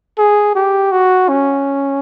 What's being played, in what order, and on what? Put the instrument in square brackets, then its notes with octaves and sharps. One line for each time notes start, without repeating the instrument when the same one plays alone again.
[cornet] G#4
G4
F#4
C#4